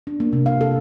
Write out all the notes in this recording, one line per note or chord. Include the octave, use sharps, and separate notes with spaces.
D4
A#3
C3
F5
A4